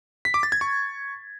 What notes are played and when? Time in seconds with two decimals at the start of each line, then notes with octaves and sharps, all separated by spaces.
0.25 B6
0.34 D6
0.43 A6
0.52 G#6
0.61 C#6